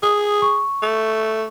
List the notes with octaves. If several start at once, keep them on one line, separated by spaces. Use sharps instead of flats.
G#4 D#6
C#6
A3